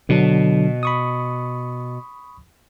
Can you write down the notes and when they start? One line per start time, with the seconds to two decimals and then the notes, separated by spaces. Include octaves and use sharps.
0.09 B2 D3 F#3 D4
0.83 B5 C#6 D#6